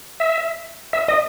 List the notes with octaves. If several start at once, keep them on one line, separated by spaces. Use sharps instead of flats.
E5
E5
D#5